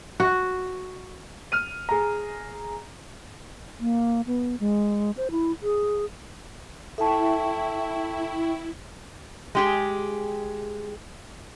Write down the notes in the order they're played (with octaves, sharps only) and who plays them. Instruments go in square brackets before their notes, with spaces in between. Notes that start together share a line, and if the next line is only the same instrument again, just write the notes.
[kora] F#4
[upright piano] F6 D#7
G#4 A#5
[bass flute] A#3
B3
G#3
C5
E4
G#4
[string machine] E4 [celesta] A4 A5 [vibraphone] E5 G5 C#6
[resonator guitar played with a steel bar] G#3 G4 G#4